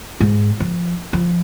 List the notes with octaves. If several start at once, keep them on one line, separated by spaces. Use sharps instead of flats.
G#2
F3
F3